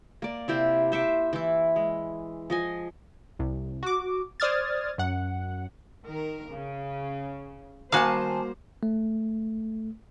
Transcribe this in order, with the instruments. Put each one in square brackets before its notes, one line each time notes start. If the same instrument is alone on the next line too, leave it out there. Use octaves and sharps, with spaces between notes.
[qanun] A#3 D5
C3 E4 G4 C5
C5 E5 C#6 D6
E3 E4
G#3
F3 D#5 G#5
[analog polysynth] C2
F#4 D6
C5 D5 D#6 F6 G#6 A6
F#2 F#5
[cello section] D#3 A#4
C#3
[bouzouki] D#3 G#5 A5 [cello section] G3 C5 [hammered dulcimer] A#3 [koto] F#4 F5
[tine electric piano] A3